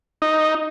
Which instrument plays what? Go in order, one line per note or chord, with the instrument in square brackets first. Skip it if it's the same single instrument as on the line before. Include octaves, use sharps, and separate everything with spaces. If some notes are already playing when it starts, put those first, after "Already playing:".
[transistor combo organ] D#4